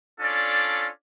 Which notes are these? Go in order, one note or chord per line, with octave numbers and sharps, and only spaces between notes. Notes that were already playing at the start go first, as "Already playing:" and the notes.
C#4 D4 F4 A4 D5